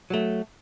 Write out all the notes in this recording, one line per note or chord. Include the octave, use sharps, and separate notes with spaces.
F#3 A3